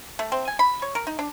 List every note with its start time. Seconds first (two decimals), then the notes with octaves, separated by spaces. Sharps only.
0.19 A3
0.32 C4
0.48 G#5
0.59 B5
0.82 C#5
0.95 A#4
1.07 D#4
1.19 D4